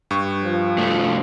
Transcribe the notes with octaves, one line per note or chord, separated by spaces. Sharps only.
G2 C#6
F3
C2 A3